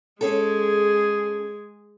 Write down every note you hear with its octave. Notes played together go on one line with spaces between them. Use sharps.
G#3 C#4 G#4 A4